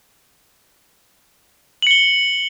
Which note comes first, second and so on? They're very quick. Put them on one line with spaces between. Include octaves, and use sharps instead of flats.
F#7 C#7 G7